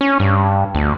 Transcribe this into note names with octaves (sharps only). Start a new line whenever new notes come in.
C#4
G2
D2